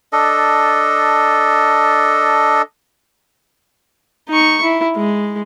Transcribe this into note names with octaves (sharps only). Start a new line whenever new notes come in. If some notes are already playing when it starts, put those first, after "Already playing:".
D4 A4 D#5
D#4 C#6
E4
G#3